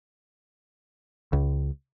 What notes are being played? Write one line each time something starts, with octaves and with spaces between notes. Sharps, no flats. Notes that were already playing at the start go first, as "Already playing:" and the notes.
C#2